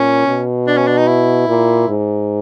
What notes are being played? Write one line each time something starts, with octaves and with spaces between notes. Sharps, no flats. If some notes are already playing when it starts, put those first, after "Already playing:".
Already playing: A#2 C#4
B2
D4
C#4
D4
D#4
E4
A#2
G#2